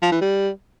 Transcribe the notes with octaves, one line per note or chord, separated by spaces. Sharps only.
F3
E3
G3